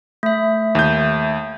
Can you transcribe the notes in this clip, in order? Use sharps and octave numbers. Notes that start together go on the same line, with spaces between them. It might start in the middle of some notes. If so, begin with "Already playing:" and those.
A3 E5
D#2 G6